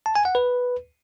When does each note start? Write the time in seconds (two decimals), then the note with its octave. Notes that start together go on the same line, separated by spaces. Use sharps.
0.06 A5
0.15 G#5
0.25 F#5
0.35 B4